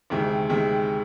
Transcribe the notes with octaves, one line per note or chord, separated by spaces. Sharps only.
D2 C3 D#3 G#3
C3 D#3 G#3